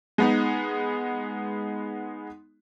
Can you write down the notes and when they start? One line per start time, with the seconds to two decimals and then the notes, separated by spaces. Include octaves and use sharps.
0.18 G#3 B3 D#4